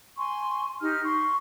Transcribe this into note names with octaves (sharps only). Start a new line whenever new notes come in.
G#5 C6 C#6
D#4 G4 F6
C6 C#6